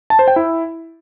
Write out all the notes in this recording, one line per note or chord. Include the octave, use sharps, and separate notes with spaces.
A5
C5
G5
E4